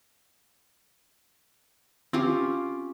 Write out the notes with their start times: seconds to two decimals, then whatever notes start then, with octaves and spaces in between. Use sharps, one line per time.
2.13 C4 C#4 F4 G4